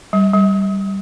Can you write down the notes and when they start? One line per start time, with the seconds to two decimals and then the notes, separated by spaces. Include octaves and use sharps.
0.13 G3
0.34 G3